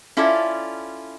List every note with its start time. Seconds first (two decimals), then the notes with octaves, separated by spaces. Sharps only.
0.17 C#4 E4 F4 A4 D5